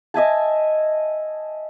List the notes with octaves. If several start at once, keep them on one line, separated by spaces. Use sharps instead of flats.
D#5 E5 G#5 A5